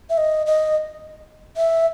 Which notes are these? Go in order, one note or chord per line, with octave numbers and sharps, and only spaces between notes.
E5
D#5
D#5
E5